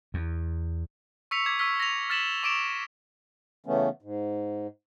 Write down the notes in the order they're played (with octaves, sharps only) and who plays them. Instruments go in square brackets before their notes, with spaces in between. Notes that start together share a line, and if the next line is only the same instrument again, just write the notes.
[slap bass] E2
[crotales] C#6 E6 B6 C#7 F7
D6 G#6 B6
C#6 E6 F6 B6
A#6 F7
F6 A6 B6 E7 F#7 G7
C#6 D6 D7 E7 F7
[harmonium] C#3 E3 A3 B3 C#4
G#2